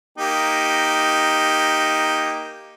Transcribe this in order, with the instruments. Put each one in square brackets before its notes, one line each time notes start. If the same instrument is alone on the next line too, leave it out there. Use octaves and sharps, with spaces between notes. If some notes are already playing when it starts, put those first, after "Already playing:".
[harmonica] A#3 D#4 G4